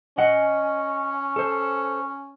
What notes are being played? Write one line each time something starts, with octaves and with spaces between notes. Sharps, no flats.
C#4 D#5 F#5
A4 C5